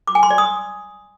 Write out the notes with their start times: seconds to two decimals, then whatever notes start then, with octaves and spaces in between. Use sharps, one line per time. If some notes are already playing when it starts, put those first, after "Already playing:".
0.07 D6
0.15 G#5
0.23 C6
0.30 D5
0.38 D#6